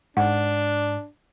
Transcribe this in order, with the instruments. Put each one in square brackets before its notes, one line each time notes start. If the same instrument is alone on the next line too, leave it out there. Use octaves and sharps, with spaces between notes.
[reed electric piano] G#2 [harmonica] D4 [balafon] F#5